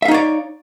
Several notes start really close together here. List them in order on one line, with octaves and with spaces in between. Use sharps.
E5 F5 D#4 C#5 D5